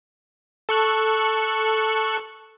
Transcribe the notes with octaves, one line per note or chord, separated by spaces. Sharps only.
A4 C#6 F#6